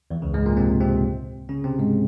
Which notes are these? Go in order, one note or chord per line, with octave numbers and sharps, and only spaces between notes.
E2 E3
C#2 C#3
G#2 G#3
A#2 A#3
C3 C4
C3 C4
C#3 C#4
C3 C4
G#2 G#3